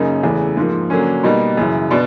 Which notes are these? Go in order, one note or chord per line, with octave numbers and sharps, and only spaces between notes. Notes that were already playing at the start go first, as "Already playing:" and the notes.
Already playing: F#2 C#3 A#3 D#4
E2 C#3 E3 A3
G#2 F3 A#3
D3 F#3 A#3 C#4
B2 G3 A#3 D#4
F#2 C#3 E3
B2 D4